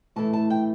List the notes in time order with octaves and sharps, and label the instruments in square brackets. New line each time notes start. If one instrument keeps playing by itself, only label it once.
[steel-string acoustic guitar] A2 E3 A3 E4 A5
A5
G5